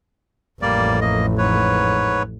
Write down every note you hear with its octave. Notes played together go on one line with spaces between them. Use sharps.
A1 F2 G3 A#3 D5
A#3 D#5
G#2 B4 C#5